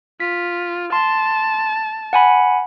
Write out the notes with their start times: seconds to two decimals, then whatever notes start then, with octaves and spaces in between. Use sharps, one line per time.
0.20 F4 B6
0.92 A5 C6
2.13 F#5 G#5 B5